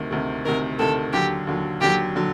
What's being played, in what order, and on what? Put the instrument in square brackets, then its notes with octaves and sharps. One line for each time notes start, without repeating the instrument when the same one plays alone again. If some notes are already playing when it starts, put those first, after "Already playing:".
Already playing: [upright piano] D2 C3 D#3
D2 C3 D#3
[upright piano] D2 C3 D#3 [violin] A#4
[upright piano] D2 C3 D#3 [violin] A4
[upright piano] D#2 D3 F#3 [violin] G4
[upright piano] D#2 D3 F#3
[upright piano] D#2 D3 F#3 [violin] G4
[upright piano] D3 F#3